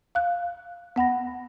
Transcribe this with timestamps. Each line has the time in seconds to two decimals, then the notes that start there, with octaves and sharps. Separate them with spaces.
0.15 F5 F#6
0.96 B3 F#5 B5 A#6